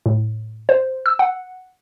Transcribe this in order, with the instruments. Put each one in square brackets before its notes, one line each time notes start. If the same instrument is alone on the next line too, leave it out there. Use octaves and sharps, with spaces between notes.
[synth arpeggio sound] A2
C5
E6
F#5